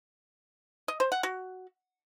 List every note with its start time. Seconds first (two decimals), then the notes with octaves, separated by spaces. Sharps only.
0.88 D#5
1.00 C5
1.12 F#5
1.23 F#4